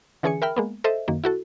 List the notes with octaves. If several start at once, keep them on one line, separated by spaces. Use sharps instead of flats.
D3 E3 C#4 G#4 G#5 C#7
A#4 E5 G5 B5 F6
G#3 A#3 B3
A4 C5 D#5 E5
F#2 D#3 A#3
E4 F#4 A4